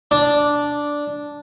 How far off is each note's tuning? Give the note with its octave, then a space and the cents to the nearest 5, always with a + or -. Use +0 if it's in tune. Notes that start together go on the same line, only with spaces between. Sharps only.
D4 -5